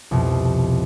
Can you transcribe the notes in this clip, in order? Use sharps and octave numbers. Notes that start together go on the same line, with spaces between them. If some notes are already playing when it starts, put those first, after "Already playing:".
C2 F2 B2